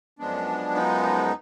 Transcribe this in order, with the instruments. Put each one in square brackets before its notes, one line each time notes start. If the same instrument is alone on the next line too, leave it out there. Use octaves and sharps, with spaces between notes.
[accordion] F#2 F3 G#3 B3 D4
D#4